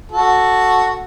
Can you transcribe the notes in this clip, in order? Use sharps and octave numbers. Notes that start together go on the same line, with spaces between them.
F#4 A4